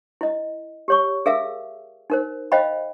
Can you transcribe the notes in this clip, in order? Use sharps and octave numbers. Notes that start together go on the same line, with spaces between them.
E4 D#5
G4 C#5 C#6
G#4 A#4 E5 F5 E6
D#4 A#4 C5
C5 D#5 F5 G5 B5